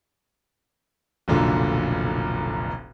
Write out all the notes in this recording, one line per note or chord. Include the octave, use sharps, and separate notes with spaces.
F1 B1 A#2 D3